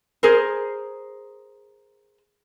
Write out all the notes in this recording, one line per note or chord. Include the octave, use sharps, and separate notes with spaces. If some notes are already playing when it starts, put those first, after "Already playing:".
G#4 A#4 C5